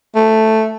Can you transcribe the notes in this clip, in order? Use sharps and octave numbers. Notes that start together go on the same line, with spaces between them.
A3